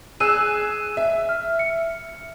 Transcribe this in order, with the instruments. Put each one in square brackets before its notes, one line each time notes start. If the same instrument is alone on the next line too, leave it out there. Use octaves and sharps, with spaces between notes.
[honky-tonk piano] G#4 E6 F#6 [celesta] D#7 E7
[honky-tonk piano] E5
[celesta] F6
C#7